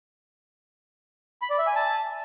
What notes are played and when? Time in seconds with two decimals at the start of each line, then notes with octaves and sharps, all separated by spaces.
1.42 B5
1.50 D5
1.59 E5
1.67 G#5
1.75 A5